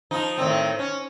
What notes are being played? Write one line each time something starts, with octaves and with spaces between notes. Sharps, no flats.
F3 D#4
A2 D#3 C4
C#4